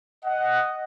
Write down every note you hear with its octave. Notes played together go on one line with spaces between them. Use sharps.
D#5 F#5